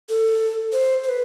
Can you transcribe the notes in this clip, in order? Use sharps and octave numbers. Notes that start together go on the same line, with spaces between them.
A4
C5
C5
B4